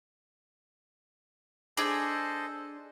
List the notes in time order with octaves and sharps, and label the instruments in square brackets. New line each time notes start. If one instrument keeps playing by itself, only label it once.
[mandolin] D4 G#4 [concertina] A4 C5 D#5